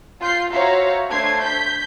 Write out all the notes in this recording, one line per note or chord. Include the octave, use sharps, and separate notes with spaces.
F4 G6 C7
F#4 C5 C#5 E5 F5 A#5
A3 D4 C5 G#6 C7
G6 B6